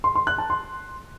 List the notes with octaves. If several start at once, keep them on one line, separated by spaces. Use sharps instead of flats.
C6
C6
F#6
A5
C6